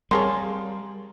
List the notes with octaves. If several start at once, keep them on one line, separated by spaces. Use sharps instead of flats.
G3 C4 G#4 A#4 C#5 F5 A5 C6